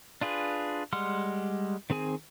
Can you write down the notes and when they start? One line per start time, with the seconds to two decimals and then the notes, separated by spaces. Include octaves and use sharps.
0.21 D4 F4 G#4 B4
0.93 G3 G#3 F#5 C6 F6
1.90 D#3 C4 G#4 G#5